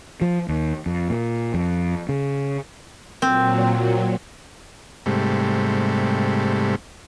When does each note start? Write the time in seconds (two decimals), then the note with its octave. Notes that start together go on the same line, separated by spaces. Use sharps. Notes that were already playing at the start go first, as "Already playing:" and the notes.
0.21 F3
0.48 D#2
0.86 F2
1.10 A#2
1.54 F2
2.09 C#3
3.22 A#2 F#3 C4
5.06 G#2 C3 G3 A3